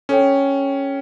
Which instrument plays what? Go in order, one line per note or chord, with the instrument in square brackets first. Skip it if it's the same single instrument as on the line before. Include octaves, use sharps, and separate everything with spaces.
[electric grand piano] C#4 [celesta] A4 C#5 G5